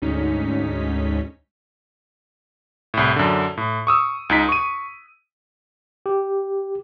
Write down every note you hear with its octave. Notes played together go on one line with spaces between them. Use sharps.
D2 G#2 C#4 D#4 B6
C2 A2
F#2 D3
A2
C#6 D#6 E6
C#2 D#4 B6
C#6 D#7
G4